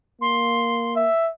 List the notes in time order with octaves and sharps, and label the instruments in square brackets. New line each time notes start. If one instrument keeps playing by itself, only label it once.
[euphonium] A#3 [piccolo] C6
[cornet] E5